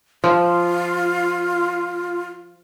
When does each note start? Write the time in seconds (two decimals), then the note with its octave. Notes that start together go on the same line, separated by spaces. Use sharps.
0.24 F3 F4